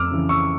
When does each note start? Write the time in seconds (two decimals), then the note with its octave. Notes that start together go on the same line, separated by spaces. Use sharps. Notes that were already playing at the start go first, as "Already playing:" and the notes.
Already playing: F2 D6 E6 F6
0.11 C#3 E3
0.29 C#6 E6